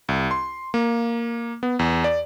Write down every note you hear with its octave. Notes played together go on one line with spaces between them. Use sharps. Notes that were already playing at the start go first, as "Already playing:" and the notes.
C2
C6
A#3
B3
E2
D5